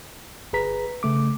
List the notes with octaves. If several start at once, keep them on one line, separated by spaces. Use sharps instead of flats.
G1 G#4 B4 A#5 B6
C#3 A3 D6